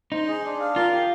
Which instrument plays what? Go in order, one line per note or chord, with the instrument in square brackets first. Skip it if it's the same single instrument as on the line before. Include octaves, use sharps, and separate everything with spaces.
[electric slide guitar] D#4 [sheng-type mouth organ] C5
[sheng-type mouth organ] G#4
D4
F5
[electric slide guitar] F4 [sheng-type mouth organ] A#4
[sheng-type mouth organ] G4